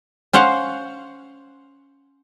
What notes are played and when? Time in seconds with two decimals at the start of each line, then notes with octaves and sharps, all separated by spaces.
0.33 C#4 C5 F5 F#5